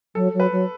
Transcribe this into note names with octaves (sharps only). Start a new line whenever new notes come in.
F#3 A4
F#3
B4
F#3